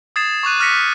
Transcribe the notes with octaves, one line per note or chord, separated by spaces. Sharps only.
D#6 G#6 A6 C7 E7
C#6 D6 F#6 D#7
D6 F6 F#6 A#6 B6 C#7